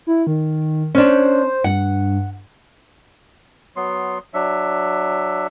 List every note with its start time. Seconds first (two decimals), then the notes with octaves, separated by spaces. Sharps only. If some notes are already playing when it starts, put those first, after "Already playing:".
0.07 E4
0.27 D#3
0.95 C#4 D4 C5
1.64 G2 F#5
3.76 F#3 B3 C6
4.34 F#3 D4 E5